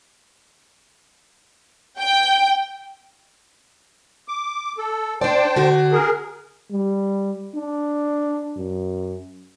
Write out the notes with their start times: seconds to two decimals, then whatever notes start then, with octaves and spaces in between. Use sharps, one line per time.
1.99 G5
4.28 D6
4.78 A4
5.21 D4 C5 D5 G5 A5
5.56 D3 F#4
5.92 G#4 A#4
6.71 G3
7.55 D4
8.57 F#2